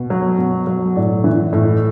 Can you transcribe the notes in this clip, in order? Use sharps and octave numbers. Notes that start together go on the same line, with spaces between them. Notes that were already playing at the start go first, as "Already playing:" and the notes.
Already playing: B2
F#3
B2
F#3
A2 D5
E3
A2